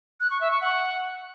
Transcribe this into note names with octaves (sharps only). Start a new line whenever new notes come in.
F#6
C#6
E5
C#6
F#5